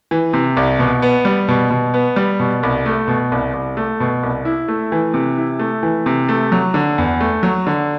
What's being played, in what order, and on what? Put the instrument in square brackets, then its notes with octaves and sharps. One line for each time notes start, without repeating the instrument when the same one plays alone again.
[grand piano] E3
C3
C2
B2
B3
G3
B2
B2
B3
G3
B2
C2
A3
B2
C2
C2
A3
B2
C2
E4
A3
E3
C3
E4
A3
E3
C3
A3
F#3
D3
E2
A3
F#3
D3